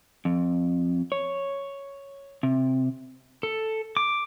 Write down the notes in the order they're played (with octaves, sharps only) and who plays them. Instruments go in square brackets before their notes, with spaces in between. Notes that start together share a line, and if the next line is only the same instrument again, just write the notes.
[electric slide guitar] F2
C#5
C3
[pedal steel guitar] A4
D6